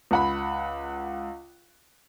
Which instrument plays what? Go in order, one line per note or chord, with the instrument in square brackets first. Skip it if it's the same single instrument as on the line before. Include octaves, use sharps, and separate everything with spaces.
[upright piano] C#2 F#5 B5